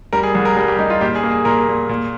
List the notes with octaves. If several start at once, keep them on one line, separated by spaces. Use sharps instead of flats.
G3 A#4
G#4
C2 G#4
A#4
G#4
G3 A#4
G4
G3 D#4
F4
A#2 G4
G#4
A#3
G#4
A#2 A#4
A#2
A#2